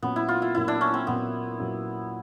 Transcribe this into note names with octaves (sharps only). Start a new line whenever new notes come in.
A#2 F#3 A#3 B3 C#4
E4
F4
E4
A#2 F#3 A#3 C#4 E4
D4
C#4
C4
A#2 F#3 A#3 B3 C#4
A#2 F#3 A#3 C#4